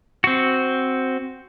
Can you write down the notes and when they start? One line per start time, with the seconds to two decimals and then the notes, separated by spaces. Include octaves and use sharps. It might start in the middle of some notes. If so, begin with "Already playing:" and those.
0.24 C4 F#4